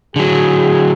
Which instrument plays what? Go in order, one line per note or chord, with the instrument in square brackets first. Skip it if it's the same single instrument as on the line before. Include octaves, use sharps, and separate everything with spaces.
[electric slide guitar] D3 F#3 [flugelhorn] G#4